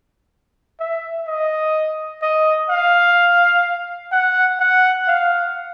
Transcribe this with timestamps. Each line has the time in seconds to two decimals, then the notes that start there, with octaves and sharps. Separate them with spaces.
0.80 E5
1.28 D#5
2.22 D#5
2.70 F5
4.12 F#5
4.60 F#5
5.08 F5